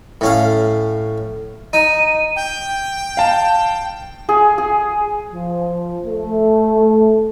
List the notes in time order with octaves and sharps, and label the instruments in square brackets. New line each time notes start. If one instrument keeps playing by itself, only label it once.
[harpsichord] A2 C#4 F5
[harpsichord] D#4 [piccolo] D#7
[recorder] G5
[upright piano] F5 A5
[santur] G#4
G#4
[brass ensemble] F3
A3